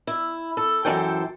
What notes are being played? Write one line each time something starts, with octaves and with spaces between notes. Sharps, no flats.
E4
A4
F#2 E3 A4 C5 G5